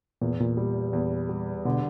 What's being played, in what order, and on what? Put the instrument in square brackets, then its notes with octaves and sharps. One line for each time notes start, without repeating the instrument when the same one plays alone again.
[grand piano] E2 [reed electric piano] A#2
[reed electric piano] A2
A#2
[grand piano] G3
E2
G3
[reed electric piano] B2 [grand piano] D3